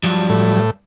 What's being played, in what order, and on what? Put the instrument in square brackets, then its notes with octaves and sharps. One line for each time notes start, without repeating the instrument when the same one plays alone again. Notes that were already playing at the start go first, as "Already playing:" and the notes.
[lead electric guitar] G2 [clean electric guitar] F3 F#3
[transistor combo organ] A2